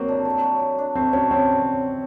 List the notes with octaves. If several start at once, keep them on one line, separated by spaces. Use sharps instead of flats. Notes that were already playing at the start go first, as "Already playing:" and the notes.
Already playing: F#3 A#3 C4
D4
A3
F#3
F#3
D4
A3 C4
F#3 C#4
F#3 C4